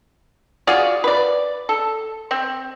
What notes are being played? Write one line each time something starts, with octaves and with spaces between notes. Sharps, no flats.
F4 F#4 G#4 D5
B4 D5
A4
C4